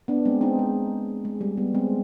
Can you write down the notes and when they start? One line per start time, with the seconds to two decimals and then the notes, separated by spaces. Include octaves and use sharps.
0.08 B3 D4
0.25 G#3 C4
0.41 C4 D#4
0.59 G#3
1.25 G#3
1.41 G3
1.57 G3 B3
1.75 G#3 C4